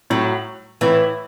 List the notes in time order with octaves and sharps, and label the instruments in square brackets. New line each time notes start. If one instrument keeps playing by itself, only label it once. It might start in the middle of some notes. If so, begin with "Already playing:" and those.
[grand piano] A2 [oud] F#3
[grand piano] A2 [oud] E3